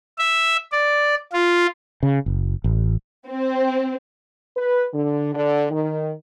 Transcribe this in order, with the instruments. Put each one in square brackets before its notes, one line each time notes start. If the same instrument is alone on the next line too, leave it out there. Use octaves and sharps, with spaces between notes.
[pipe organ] E5
D5
F4
[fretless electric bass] C#3
F#1
A1
[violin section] C4
[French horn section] B4
D3
D3
D#3